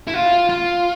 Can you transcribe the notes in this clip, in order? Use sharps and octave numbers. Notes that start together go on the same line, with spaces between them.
E4
F4
F4